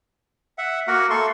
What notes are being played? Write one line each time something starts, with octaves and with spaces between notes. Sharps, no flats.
E5 F#5
A#3 F#4 A#4 F#5
A3 A4 C6 C#6